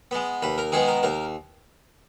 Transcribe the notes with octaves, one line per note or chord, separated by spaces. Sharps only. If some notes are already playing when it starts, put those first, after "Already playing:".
G#3 B3
D#2 B4
A#4
D#3 G#3 B3 G#4
A#4
D#2 A#4